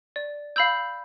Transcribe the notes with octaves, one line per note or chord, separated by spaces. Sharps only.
D5
F5 B5 E6 G6